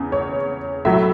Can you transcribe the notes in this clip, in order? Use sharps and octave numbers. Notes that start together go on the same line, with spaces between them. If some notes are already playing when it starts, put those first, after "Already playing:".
Already playing: E2 C#3
C#5
A2 F#3 E5